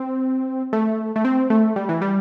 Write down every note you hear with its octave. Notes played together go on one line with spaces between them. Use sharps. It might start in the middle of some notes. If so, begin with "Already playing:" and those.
Already playing: C4
A3
A3
C4
A3
G3
E3
G3